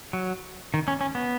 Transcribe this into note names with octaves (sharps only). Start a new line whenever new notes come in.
F#3
D#3
C#4
C#4
B3